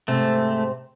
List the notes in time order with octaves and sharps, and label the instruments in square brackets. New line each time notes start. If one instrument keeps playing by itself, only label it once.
[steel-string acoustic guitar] G#2 C3 C4 [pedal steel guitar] A3